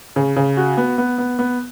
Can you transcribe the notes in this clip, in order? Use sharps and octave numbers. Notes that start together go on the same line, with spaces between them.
C#3
C#3
F#4
B3
B3
B3
B3